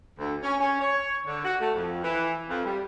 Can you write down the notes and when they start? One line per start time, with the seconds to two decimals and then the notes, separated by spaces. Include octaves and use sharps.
0.19 D2
0.42 C#4
0.61 C#4
0.80 C#5
1.27 D3
1.45 F#4
1.61 A3
1.74 F2
2.04 E3
2.50 F2
2.65 G3